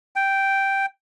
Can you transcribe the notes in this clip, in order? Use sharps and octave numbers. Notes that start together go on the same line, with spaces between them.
G5